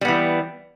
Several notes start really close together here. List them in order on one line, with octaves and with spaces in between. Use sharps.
G3 B3 E3